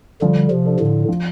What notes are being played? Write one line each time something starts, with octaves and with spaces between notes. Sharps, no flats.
D3 F3 G3
C3 F3
D4 A4
A2 D3
F3